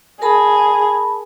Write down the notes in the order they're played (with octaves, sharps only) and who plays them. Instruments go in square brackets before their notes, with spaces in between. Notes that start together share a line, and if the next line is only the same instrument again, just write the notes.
[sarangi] G#4 [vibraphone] A#4 A5 B5